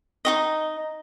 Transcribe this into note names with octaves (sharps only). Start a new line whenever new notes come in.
D#4 F#4 D#5